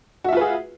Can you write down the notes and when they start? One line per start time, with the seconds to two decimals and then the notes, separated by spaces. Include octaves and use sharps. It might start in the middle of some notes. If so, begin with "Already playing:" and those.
0.24 F#4
0.29 E5
0.33 F4
0.37 B4
0.41 G#4